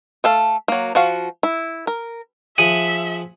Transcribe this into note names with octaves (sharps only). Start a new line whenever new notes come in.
A3 A4 F5
F#3 A#3
F3 F#4 F5
E4
A#4
F3 G#4 E5 F#5 D#7